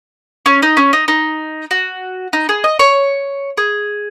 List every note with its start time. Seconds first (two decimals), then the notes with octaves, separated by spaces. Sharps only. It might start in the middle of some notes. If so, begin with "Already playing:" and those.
0.46 C#4
0.62 D#4
0.77 C#4
0.93 D#4
1.08 D#4
1.71 F#4
2.33 D#4
2.49 G#4
2.64 D#5
2.79 C#5
3.58 G#4